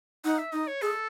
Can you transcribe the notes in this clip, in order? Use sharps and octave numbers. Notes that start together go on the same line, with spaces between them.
D#4 F#5
E5
D#4 D#5
C#5
G#4 A4